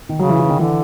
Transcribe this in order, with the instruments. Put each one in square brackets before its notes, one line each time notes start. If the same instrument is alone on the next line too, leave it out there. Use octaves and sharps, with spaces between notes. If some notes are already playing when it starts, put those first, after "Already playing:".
[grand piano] D#3
[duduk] C#3 [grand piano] F#3
[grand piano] E3
E3
D#3
[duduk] D3 [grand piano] E3